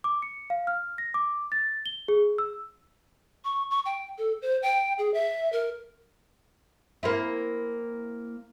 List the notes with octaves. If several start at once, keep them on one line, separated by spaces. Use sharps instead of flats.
D6
C#7
F5
F6
A#6
D6
A6
G7
G#4
E6
C#6
C#6
G5
A4
C5
G5
G#4
E5
A#4
A#3 C4 E4